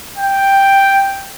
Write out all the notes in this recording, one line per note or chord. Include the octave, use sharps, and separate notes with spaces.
G5